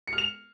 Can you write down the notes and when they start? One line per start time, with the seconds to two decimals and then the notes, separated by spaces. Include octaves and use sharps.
0.07 C#7
0.13 F6
0.18 F7